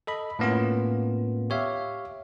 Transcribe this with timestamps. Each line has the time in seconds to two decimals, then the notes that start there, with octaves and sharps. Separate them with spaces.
0.07 A4 D#5 B5
0.39 A2 A#3 B3 C#4 F4
1.50 G4 C#5 E5 F5